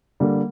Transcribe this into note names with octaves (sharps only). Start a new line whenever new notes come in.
D3 G3 A#3